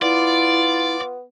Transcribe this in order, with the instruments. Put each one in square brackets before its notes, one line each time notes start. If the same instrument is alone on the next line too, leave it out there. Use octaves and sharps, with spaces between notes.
[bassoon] B3 [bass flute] E4 [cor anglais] F4 [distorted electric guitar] D5